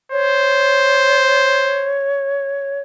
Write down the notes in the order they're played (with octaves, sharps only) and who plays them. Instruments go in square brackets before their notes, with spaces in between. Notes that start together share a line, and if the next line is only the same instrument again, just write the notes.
[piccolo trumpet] C5 [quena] C#5